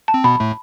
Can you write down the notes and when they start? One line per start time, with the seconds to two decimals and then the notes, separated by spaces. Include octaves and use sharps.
0.08 A5
0.14 C4
0.24 B2 B3 B5
0.40 A2 A3